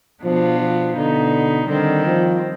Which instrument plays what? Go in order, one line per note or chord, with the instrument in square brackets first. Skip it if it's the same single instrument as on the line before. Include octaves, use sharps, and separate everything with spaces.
[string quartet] B2 B3 D4 F4 [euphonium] F3
[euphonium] F3
[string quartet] B2 B3 D#4 [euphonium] D3
[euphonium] D3 [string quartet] D#3 G3 C4
[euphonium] F3